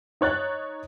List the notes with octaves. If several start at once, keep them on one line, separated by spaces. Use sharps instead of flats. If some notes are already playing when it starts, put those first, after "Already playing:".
D#4 C#5 F#6 A6